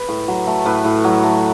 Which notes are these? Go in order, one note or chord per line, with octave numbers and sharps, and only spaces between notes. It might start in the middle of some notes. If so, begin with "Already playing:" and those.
Already playing: B4
A2
F#3
A3
A2 B4
A2
F#3
A3